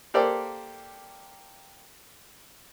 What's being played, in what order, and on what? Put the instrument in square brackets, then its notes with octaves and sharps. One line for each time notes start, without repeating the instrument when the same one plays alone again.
[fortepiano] A#3 G4 A4 C5 D5